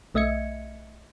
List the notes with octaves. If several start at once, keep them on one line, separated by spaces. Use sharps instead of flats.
B1 A3 D#5 E5 G#6 C#7